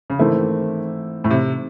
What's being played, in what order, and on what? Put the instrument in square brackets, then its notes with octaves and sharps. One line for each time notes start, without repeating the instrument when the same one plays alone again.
[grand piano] C#3
[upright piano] G#2 E3 A3 C4 E4 [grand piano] D#3
[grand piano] A2
C3